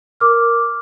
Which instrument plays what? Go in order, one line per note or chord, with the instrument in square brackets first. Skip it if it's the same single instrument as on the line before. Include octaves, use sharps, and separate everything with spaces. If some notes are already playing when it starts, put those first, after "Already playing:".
[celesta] A#4 D6 F6